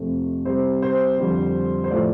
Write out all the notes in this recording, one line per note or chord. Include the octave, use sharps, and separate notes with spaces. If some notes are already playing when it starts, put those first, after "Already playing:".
Already playing: F2 C3 A3
C3 G3 C5
C5
F2 D3 G3
C5
A2 F3 A3 D5